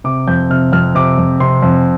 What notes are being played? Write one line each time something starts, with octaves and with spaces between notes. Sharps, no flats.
C3 D6
F2 G6
C3 F6
F2 F6
C3 D6
F2
C3 C6
F2